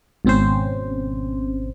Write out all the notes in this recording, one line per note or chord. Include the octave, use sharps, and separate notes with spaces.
G#1 B2 C4 C#4 C5